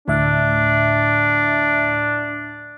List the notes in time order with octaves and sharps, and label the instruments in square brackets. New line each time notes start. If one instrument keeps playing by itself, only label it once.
[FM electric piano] D2 A2 E5 [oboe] D4